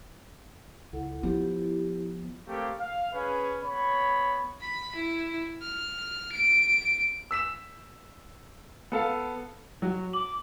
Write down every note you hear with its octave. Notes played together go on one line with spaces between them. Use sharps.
C#2 E4 A4 F#5
F3 B3 E4 G4
A3 A#3 C4 G4 F5
F5
C#4 G#4 B4
B3 C#5 B5
B5
E4
F6
D7
E6 B6 E7
B3 A4 F5
F#3 F#4
D6 F#7